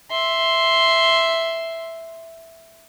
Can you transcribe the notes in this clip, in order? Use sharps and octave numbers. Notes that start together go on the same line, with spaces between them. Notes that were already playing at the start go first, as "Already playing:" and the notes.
E5 C6